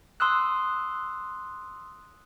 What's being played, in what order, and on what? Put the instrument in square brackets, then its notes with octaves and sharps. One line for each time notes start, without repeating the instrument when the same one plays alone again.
[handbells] C6 D#6 E6 F#6